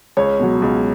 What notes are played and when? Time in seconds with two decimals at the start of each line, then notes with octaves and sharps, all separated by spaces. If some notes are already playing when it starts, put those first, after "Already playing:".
0.17 C#2 C#5
0.39 B2 F#3
0.62 C#2